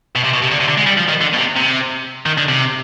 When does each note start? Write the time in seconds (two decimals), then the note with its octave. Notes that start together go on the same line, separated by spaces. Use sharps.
0.16 B2
0.24 C3
0.33 B2
0.42 C3
0.51 D3
0.60 C3
0.68 D3
0.77 G#3
0.86 G3
0.97 F3
1.09 D#3
1.21 D3
1.33 B2
1.38 C3
1.56 C3
2.26 D#3
2.38 D3
2.49 C3